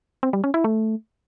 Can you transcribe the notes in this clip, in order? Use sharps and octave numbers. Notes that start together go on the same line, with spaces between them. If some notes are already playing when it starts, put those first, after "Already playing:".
C4
G3
C#4
E4
A3